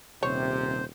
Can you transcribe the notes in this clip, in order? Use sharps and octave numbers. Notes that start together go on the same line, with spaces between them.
D#1 C3 C5 C#5